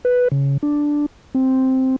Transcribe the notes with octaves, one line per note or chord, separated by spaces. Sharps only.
B4
C#3
D4
C4